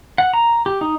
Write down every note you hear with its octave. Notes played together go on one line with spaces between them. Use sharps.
F#5
A#5
G4
D#4